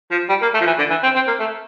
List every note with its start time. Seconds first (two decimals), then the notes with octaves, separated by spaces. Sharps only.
0.11 F3
0.29 G3
0.42 A#3
0.54 A3
0.61 F3
0.66 E3
0.78 D3
0.90 E3
1.03 C4
1.15 C4
1.27 A#3
1.39 A3